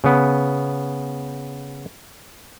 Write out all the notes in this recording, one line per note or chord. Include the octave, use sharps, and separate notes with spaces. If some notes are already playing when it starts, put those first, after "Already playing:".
C#3 B3